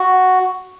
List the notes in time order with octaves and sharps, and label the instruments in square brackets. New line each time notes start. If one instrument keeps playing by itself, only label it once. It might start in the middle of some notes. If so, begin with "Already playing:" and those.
Already playing: [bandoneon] F#4